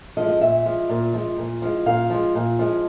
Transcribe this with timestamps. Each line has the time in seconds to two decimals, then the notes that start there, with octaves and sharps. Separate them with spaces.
0.17 F3 D#5
0.21 G#3
0.28 D#5
0.41 A#2 E5
0.66 F3 G#3
0.90 A#2
1.14 F3 G#3
1.37 A#2
1.62 F3 G#3
1.86 A#2 F5
2.10 F3 G#3
2.35 A#2
2.59 F3 G#3